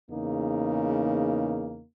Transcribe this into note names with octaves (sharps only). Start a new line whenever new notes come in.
E2 C#3 A#3 D#4